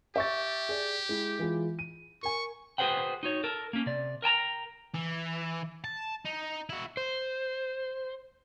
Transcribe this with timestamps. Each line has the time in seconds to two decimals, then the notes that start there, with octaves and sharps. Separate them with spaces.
0.16 G4 E5 C#6 A6
0.69 G#4 D5
1.09 G#3 E4
1.39 E3 G#3 F4
1.79 D#7
2.23 A#4 G#5 C#6
2.78 F#4 G#4 B4 C5 F#5 G5
3.23 D#4 F#4 C#5
3.44 A4 A#4
3.73 A#3 C#4
3.86 C3 D5
4.22 A#4 G5 A5 A#5
4.95 E3
5.84 A5
6.25 D#4
6.70 E4 F#4
6.97 C5